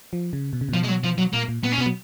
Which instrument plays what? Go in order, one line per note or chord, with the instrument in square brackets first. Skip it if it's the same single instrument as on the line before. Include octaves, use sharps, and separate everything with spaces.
[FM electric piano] F3
C#3
B2
C#3
[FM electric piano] B2 [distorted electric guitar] F3
[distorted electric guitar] G#3
F#3
F3
F#3
[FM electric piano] A#2 [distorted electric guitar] A#3
[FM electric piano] A#2
[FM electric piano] A#2 [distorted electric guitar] B3
[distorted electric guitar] C#4
[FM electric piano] B2 [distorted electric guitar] B3
[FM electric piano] F#3